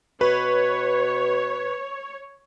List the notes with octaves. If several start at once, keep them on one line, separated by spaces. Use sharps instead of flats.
B2 B4 C#5